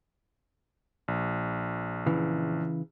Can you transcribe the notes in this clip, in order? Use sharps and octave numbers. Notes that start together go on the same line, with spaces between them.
A#1
C#3 E3